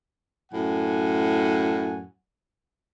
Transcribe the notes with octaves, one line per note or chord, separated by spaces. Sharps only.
F#2 A2 F#5 G#5